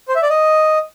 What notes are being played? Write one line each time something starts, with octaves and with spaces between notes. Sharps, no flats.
C5
E5
D5
D#5